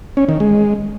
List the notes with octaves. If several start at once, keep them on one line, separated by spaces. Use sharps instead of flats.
C#4
D#3
G#3